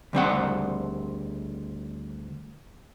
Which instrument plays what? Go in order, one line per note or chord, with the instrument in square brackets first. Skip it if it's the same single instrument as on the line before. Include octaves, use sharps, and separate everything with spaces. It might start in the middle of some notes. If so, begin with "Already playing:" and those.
[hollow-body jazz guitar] D2 G3 C4 F#5